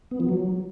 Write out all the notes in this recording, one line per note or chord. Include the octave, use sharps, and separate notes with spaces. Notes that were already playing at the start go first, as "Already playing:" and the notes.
B3
F3
F#3